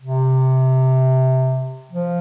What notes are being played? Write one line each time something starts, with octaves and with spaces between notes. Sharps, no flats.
C3
F3